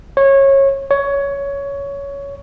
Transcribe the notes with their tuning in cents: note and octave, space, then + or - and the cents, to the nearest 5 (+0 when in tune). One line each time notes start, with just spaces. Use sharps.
C#5 -20
C#5 +15